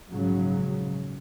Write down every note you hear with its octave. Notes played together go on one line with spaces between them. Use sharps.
A#1 G#2 C#3 F#3